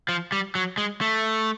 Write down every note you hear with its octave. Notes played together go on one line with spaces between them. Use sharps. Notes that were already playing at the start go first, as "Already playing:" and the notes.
F3
G3
F#3
G#3
A3